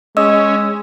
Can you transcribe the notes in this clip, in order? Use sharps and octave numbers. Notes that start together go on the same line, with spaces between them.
G#3 C#4 D#5 E6